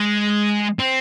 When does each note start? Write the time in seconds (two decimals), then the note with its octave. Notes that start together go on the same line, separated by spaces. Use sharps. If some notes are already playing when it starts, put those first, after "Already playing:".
Already playing: G#3
0.79 C4